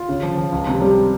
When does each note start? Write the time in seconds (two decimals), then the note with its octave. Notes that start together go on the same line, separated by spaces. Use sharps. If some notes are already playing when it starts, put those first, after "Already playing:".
Already playing: F4
0.09 C#3
0.23 F3
0.37 F3
0.52 C#2
0.67 C3
0.81 G3